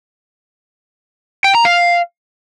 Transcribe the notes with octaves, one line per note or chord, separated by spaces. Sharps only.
G5
A#5
F5